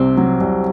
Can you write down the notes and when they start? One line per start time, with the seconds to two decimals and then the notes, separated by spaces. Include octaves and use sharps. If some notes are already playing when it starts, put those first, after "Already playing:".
Already playing: C2 C3 C4
0.17 F#3
0.41 C2